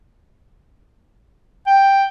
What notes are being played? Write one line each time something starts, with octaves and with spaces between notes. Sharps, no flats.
G5